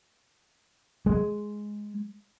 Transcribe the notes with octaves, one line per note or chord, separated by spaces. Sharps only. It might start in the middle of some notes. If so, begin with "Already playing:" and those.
G#3